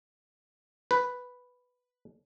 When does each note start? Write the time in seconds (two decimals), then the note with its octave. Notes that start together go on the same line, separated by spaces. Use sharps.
0.91 B4